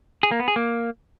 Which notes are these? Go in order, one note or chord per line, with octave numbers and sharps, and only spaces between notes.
G#4
A#3
B3
G#4
A#3